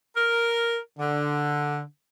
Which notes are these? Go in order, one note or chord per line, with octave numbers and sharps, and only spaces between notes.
A#4
D3